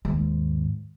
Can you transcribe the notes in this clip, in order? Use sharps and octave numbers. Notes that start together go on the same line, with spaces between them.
D#2 G#2